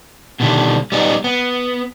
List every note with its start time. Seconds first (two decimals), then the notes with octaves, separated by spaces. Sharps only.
0.40 B2 D3 D#3 G3
0.92 G3 B3 D#4
1.24 B3